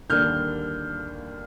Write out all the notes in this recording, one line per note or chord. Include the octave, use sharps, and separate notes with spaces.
D#2 D3 G3 A#3 D4 F6 G6